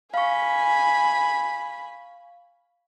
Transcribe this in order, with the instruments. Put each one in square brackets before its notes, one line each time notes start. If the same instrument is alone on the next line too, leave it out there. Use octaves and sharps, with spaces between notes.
[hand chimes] F5 C#6 [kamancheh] G#5 B5